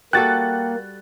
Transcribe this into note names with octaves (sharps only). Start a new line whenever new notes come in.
G3 A#3 F#4 A4 G5 F#6 A6